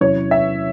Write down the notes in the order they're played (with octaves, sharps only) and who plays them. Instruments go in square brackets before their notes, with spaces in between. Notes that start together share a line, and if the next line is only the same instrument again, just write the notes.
[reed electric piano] E2 C3 F#3 C#4 E4 [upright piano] C#5
[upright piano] E5